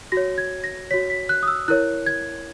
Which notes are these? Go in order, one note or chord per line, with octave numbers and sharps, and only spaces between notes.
F#4 C#5 A#6
G#6
A#6
F#4 C#5 B6
B6
F#6
D#6
E6
E4 A#4 C#5 F#6
G#6